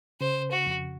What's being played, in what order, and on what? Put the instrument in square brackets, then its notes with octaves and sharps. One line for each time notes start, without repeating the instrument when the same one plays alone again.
[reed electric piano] C#3 [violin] C5
[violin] F#4
[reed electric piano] F2